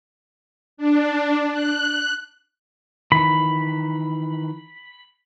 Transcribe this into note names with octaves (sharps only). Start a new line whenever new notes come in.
D4
F#6
D#3 E3 B5